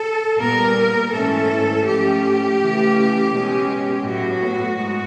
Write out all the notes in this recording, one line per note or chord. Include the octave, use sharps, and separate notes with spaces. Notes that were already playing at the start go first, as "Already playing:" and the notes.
Already playing: A4
A#2 G3 B3 A#4
G#2 E3 A3 C#4 A4
G#2 F3 A3 C#4 G4
C#3 E3 A3 C#4
B2 G#3 C#4
A2 F#3 B3 F#4
G#2